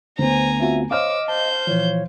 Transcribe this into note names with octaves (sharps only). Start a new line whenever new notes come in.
D2 B3 C5 G#5 A#5
C4 F4 F#4 E5
C5 C#5 D#5 F5 D6 E6 F6
C5 A5 G6
A#2 E3 F3 C#5